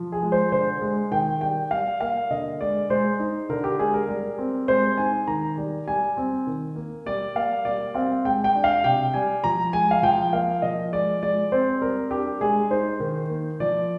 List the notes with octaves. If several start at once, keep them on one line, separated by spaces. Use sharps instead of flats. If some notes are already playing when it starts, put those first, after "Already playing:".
Already playing: F3
G#4
G#3
C5
D3 C5
G#3
D#3 G5
G3 G5
G3 F5
A#3 F5
D3 D#5
G#3 D5
G#3 C5
D#4
D3 A#4
G4
G#3 G#4
A#4
G3
C4
G#3 C5
D#4 G#5
D#3 A#5
G3
G3 G#5
C4
D#3
A#3
G3 D5
A#3 F5
G3 D5
C4 F5
G#3 G5
G5
D4
F5
C3 G5
G3 G#5
F3 A#5
G#3 G#5
F5
F3 G5
A#3 F5
F3 D#5
G#3 D5
G#3 D5
C4 C5
G3 A#4
D4 G4
G#3 G#4
D#4 C5
D#3
A#3
F3 D5